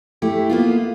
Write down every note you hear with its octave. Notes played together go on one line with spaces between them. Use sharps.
A3 E4 G4
A#3 B3 F4